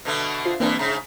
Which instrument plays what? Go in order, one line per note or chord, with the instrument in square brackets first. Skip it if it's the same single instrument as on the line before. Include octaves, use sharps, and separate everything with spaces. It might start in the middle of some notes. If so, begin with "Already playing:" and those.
[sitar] B2 D3 A3
[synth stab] F4 C5 C7
[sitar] G2 B2 E3 [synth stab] A#3 C4 D4
[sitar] G#2 C#3 [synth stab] A#5